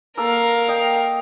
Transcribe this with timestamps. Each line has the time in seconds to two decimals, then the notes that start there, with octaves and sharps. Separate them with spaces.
0.18 A#3 A4 A#4 F5
0.68 D#5 G5